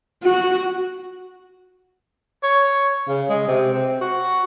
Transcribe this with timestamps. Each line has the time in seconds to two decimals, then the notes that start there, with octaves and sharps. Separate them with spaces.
0.23 F#4
2.43 C#5
3.08 C#3
3.29 G#3
3.47 C3
3.73 C4
4.01 F#4